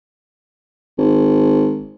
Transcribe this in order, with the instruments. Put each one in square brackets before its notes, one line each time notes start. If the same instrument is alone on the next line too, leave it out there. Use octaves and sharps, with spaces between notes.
[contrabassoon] G#1